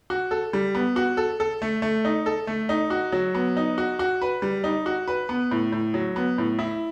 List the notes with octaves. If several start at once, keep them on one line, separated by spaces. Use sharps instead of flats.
F#4
A4
G3
B3
F#4
A4
A4
A3
A3
D#4
A4
A3
D#4
F#4
F#3
B3
D#4
F#4
F#4
B4
G3
D#4
F#4
B4
B3
A2
A2
F#3
B3
A2
E4